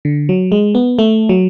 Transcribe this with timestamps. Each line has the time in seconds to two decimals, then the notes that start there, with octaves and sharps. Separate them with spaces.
0.05 D3
0.29 F#3
0.52 G#3
0.75 B3
0.99 A3
1.29 F#3